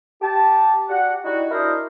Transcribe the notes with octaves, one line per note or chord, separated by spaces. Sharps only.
G4 A5
F#4 G4 D5 F#5
G3 D#4 E4 F#4
D4 E4 F#4 A#4 C5 D#5